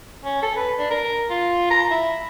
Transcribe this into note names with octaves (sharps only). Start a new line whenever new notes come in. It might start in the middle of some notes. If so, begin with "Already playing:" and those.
C#4
A4
B4
D4
A#4
F4
A#5
E4